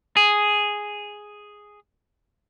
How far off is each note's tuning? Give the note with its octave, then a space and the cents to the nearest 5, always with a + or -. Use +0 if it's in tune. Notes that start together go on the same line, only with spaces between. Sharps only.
G#4 +0